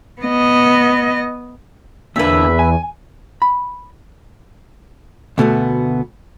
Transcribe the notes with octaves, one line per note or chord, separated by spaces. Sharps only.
B3 D#5
E2 A#2 D3 A#3 B4 E5
G#5
B5
D2 B2 A3 B3